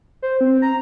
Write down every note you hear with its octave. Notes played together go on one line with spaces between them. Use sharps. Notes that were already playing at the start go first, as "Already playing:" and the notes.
C5
C4
A#5